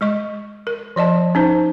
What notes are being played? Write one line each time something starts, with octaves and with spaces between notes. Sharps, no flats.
G#3 D#5 C#6
A#4
F3 D5 D#5 A5
C#4 D#4 C5